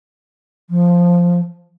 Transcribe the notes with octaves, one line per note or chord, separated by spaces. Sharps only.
F3